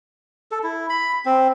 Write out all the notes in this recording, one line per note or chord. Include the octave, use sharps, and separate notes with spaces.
A4
E4
B5
C4